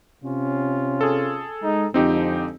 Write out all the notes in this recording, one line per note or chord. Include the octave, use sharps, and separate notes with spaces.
C3 C#4 F4
G#4 A4
G#3 D#4
F2 D3 G#3 C4 D#4 G4